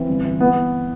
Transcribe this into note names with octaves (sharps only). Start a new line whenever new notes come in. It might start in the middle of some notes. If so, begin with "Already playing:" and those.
Already playing: E3 C4
G1
E3
B3